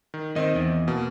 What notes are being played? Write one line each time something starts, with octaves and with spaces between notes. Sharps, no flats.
D#3
D#3 C4 D#5
E2
B2 A#3